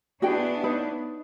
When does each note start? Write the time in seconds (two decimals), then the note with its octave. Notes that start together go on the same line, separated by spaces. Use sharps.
0.22 B3 D4 E4 F#4 G#4 G5
0.64 D#4 B4 C#5